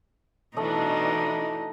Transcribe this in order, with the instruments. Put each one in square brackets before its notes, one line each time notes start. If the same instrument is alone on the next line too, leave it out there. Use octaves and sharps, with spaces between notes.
[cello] B2 D#4 [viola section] E3 D4 [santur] A3 D#5